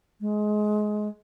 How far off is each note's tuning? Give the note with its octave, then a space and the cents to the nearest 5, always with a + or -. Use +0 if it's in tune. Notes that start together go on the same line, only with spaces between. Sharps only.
G#3 +20